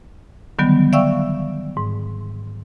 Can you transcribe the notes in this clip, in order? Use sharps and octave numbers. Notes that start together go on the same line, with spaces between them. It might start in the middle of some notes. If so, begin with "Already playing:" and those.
D3 D#3 F#3 G3 B3
D5 E5 F5 G5 C#6 E6
G#2